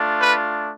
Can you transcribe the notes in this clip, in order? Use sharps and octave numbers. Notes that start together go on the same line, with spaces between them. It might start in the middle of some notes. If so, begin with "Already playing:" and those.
Already playing: A3 D4 F4
B4